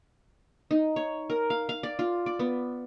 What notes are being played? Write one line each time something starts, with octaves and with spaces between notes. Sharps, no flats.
D#4
C#5
A#4
F5
F5
D5
F4
D5
B3